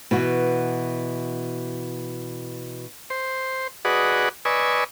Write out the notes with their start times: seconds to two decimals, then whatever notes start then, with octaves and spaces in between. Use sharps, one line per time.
0.11 B2 E3 F#4
3.10 C5
3.85 F#4 G#4 B4 D5 D#5 F#5
4.45 B4 D5 D#5 G#5 C#6 E6